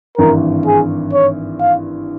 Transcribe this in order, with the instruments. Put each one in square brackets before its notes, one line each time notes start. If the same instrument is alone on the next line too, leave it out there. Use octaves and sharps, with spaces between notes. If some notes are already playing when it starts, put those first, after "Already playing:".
[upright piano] G#1 G2 E3 [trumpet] A#4
[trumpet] G#4
C#5
F5